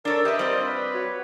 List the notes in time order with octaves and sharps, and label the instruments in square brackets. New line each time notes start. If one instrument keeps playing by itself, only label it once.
[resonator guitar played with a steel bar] D4 A4 C#5 [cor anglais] A#4 [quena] D5
[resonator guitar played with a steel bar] G4 B4 [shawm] D#5 [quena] E5
[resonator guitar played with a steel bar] G3 C4 [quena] C5 [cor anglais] D5
[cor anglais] F4
[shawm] B4 [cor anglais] D5
[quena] F#4 [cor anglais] C#5